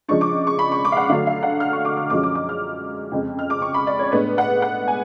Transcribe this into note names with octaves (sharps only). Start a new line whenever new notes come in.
C#3 F3 G#3 D4 C#6
D6
C#6
B5
C#6
D6
F5
F#5
D3 F#3 A3 D4 F5
F5
F#5
F6
C#6
D6
F6
F#2 F3 G#3 C#4 D6
D6
D6
F6
F2 C#3 G#3
F6
D6
C#6
B5
D5
C#5
A2 G#3 B3 D4 B4
F#5
F#5
G#5